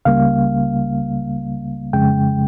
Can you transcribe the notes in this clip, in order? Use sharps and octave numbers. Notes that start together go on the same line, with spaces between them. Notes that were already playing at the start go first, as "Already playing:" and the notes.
C#2 C#3 G3 A#3 F5
F2 C#3 G#3 G5